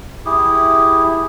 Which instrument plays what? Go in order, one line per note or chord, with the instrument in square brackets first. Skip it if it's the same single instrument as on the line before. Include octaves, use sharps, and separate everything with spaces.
[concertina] E4 G4 G#4